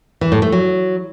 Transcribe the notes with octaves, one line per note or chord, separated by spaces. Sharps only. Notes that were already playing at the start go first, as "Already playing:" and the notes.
E3
A2
A3
F#3